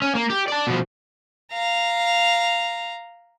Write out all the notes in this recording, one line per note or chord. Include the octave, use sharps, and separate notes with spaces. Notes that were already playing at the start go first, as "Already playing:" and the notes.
C#4
A#3
G4
D5 A5
B2 F3
F5 A#5